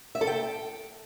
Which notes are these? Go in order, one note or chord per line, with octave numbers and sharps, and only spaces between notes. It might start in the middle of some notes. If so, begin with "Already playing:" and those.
E5
A4
G5